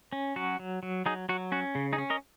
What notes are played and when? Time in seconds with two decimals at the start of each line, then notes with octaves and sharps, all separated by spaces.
0.13 C#4
0.36 F#3 F#4
0.59 F#3
0.83 F#3
1.06 F#3 D#4 G#4
1.29 F#3 F#4
1.52 C#4 F#4
1.75 C#3
1.93 D#4 G#4
1.98 C#4
2.10 A#4 D#5